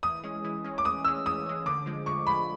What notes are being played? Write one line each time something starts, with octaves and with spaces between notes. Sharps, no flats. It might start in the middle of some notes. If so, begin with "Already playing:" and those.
E3 D#6
G#3 C#4
E3
G#3 C#4
D6
E3 D#6
G#3 C#4 E6
E3 D#6
G#3 C#4
D3 D6
F3 G#3
D3 C#6
F3 G#3 B5